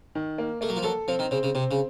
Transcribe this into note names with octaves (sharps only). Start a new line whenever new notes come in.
D#3
A#3
A3 A#3
F#3
F3
F#3 A4
F3 C4
D#3
C#3 C4
C#3
C3 C4
C#3